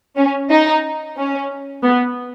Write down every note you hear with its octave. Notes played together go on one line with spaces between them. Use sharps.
C#4
D#4
C#4
B3